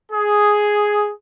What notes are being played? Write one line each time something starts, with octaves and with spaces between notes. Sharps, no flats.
G#4